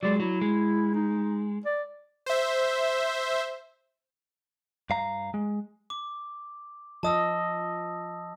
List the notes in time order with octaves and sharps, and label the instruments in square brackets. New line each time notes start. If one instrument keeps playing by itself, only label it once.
[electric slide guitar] F#3 G#3 [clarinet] D5
[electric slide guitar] F#3 [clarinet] E4
[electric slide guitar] G#3
[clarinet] D#4
D5
[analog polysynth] C5 E5
[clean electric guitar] G2 F5 A#5
G#3
[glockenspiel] D6
[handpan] F3 D#5 [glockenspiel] A5 D#6 E6